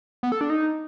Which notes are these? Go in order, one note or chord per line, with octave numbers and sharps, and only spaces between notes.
B3
A4
D4
D#4